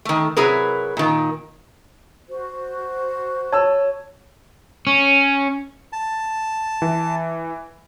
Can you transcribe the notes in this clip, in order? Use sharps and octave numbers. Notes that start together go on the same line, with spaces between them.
D#3 A3
C3 F#3 E4 G#4 A#4 B4
A#2 D#3
F#4 C5
C#5 A5 E6
C#4
A5
E3